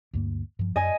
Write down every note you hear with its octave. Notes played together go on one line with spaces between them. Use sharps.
D2 G2 A#3
G2 F3
F#2 D#5 G#5